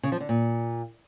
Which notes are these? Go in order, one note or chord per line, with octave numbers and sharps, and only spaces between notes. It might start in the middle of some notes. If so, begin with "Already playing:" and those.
C#3
F3
D3
A#2